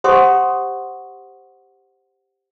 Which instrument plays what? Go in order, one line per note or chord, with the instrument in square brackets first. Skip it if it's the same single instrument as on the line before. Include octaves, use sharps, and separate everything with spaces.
[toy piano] G4 C5 F#5 C6 C#6 D#6